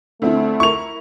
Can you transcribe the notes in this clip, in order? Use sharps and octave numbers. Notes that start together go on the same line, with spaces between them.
D2 A3 C4 E4
E4 A#4 C#6 F7